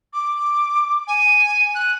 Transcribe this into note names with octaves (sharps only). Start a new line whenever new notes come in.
D6
G#5
F#6